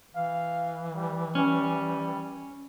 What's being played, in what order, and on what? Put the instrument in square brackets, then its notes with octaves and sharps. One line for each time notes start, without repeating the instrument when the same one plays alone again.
[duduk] E3 [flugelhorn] F5
[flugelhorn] G3
[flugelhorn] G3 [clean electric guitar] C#4